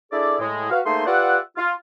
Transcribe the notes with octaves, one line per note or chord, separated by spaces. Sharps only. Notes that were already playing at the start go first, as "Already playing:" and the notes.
D4 E4 G#4 A4 D5
A2 G#3
F#4 B4 F5
A3 A#3 D#4 G#4 C5 C6
F4 G4 B4 D5 E5 F#5
F4